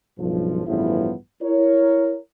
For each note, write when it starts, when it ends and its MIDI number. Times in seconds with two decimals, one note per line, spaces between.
0.19 0.66 35
0.19 0.66 43
0.19 0.66 49
0.19 0.66 53
0.67 1.13 33
0.67 1.13 43
0.67 1.13 49
0.67 1.13 53
0.67 1.13 59
0.67 1.13 64
1.42 2.17 64
1.42 2.17 70
1.42 2.17 73